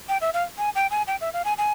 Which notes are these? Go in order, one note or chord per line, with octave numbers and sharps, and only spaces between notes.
G5
E5
F5
G#5
G5
G#5
G5
E5
F5
G#5
G#5